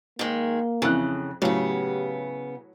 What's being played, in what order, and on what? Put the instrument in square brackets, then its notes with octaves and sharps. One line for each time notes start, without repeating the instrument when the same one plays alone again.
[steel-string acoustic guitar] D#3 G#3 [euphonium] A#3
[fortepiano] F2 E3 F#6 [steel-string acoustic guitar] C#3
[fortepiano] A2 F#3 [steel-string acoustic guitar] C#3 B3 [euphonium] G4